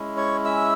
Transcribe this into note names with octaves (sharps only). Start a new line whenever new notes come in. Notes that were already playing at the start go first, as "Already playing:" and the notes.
Already playing: G#3 C#4 E4
C#5 C#6
E5 E6